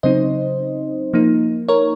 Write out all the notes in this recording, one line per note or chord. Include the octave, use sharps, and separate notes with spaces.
C#3 F#3 C4 D#4 C5 D#5
F3 A#3 D#4
A#4 C#5